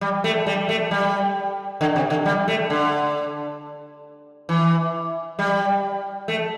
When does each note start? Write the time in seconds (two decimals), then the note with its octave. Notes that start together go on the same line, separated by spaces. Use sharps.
0.01 G3
0.24 A3
0.46 G3
0.69 A3
0.91 G3
1.81 D3
1.96 C3
2.10 D3
2.26 G3
2.48 A3
2.70 D3
4.49 E3
5.39 G3
6.28 A3